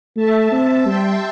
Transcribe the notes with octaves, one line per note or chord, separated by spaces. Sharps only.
A3 E5 A5
C4
G3 G5 C6